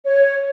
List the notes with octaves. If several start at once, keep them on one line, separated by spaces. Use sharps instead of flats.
C#5